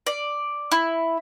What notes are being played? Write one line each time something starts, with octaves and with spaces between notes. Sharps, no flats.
D5
E4